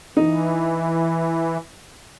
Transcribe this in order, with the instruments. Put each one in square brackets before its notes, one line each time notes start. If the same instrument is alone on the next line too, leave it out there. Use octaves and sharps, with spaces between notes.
[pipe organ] E3 [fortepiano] D#4